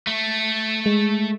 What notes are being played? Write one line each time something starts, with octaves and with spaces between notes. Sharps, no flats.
A3
G#3